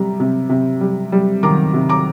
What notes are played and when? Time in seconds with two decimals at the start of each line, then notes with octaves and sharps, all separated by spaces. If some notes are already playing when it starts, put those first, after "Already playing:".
Already playing: C3 G3 A#5
0.20 C3
0.49 C3
0.81 G3
1.12 G3
1.43 D#3 A#5 D6
1.74 C3
1.89 A#5 D6